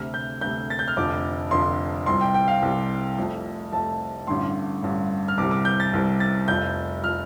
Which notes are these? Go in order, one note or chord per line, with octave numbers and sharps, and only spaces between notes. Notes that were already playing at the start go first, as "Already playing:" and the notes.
Already playing: D2 C3 A3 F6
G6
D2 C3 A3 G6
A6
G6
F6
F1 F2 D3 F3 D6
F1 F2 D3 F3 C6
C2 C3 G3 C6
G5
G5
F5
C2 C3 G3
F1 F2 F3 A3
F1 F2 F3 A3 A5
A1 G2 D3 G3 C6
A1 G2 D3 G3
F6
C2 C3 G3 D6
D6
G6
A6
C2 C3 G3
A6
F1 F2 F3 G6
F3 F6